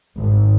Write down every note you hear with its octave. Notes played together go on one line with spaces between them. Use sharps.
G#1